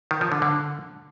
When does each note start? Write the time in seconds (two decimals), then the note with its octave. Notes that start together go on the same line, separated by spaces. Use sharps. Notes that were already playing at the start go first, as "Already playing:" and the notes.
0.11 D#3
0.21 F3
0.32 D3
0.42 D3